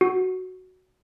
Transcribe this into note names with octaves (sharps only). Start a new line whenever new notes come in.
F#4